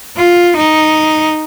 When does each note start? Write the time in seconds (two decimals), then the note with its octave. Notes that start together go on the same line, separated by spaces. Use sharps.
0.17 F4
0.56 D#4